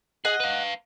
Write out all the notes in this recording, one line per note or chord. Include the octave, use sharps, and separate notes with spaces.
G#4 D#5 F#5
B4 F5